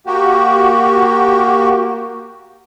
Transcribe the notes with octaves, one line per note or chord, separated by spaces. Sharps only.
A#3 F#4 G4